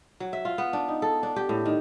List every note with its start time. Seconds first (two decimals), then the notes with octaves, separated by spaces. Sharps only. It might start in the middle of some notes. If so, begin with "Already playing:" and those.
0.20 F#3
0.33 E5
0.45 F4
0.58 B3
0.73 D4
0.88 D#4
1.02 A4
1.23 D4
1.36 G4
1.49 A2
1.65 D#3